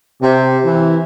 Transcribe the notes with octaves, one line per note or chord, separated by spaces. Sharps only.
C3
E3